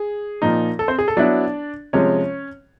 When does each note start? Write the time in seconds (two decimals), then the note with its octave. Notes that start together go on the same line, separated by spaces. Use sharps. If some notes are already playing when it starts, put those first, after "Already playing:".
Already playing: G#4
0.42 A#2 F3 A#3 D#4
0.79 A4
0.88 C4 C5
0.98 G#4
1.08 A4
1.17 F#3 B3 D4 E4 D5
1.93 C3 F3 G#3 C#4 C#5